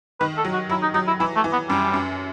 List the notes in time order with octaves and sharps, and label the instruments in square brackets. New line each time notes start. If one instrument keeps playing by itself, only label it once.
[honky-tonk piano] D#3 [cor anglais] B4
[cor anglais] A4
[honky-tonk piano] F#3
[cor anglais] F#4
[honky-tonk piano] F#3 [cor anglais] E4
[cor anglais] D#4
[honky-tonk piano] F#3 [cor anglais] D#4
[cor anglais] E4
[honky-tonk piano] E3 [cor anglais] E4
[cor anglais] A3
[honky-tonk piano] E3
[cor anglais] B3
[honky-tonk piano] F#2 [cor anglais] G3
[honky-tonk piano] F#2